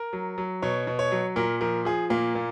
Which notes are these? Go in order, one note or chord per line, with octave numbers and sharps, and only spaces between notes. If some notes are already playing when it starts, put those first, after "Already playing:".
Already playing: A#4
F#3
F#3
B2 C#5
B2
C#5
F#3
A#2 A#4
F3 A#4
F3 G#4
A#2 A#3
A#2